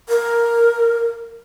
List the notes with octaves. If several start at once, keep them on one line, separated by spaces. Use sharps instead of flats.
A#4